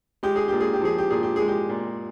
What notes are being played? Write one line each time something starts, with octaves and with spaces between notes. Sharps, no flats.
G#3 G4
G#4
A#2 G4
G#4
G4
F3 G#4
G4
A#2 G#4
G4
G#3 G#4
G4
A#2